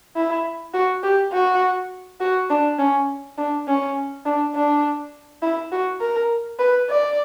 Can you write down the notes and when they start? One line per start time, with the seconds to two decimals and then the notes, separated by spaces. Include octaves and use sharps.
0.16 E4
0.74 F#4
1.03 G4
1.33 F#4
2.20 F#4
2.50 D4
2.78 C#4
3.38 D4
3.67 C#4
4.25 D4
4.55 D4
5.42 E4
5.72 F#4
6.01 A#4
6.59 B4
6.89 D5